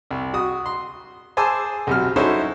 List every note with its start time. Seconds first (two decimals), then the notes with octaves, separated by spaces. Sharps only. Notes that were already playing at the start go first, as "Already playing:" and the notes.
0.11 C2
0.34 F#4 D#6
0.66 C6
1.37 G#4 C5 G#5 A5 D6 E6
1.87 B1 C3 F#3 F6
2.16 C#4 D#4 E4 F#4 A4 C5